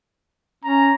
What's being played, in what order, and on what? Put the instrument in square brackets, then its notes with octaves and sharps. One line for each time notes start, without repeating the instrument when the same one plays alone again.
[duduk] C#4 [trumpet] A#5